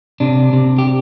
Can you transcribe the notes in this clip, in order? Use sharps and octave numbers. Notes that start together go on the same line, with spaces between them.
C3 D4
C3
G4